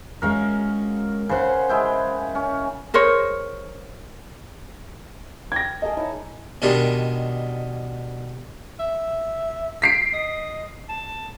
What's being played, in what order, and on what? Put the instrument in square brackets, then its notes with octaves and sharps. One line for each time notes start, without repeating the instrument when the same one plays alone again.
[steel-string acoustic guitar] G#3 C#4 F#4 [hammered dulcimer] A#4 F5
[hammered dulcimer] C#3 F#5 [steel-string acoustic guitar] B4 C5
[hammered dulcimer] G#3 E4 G5
C#4
[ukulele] G#4 A#4 C5 C#5
[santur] G5 [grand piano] G#6 A#6
[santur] G#4 A#4 A5 [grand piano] D#5
[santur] D#4 E4 C#5
[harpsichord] B2 D#3 G3 G#3 D4
[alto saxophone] E5
[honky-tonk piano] B6 C7 D7
[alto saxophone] D#5
A5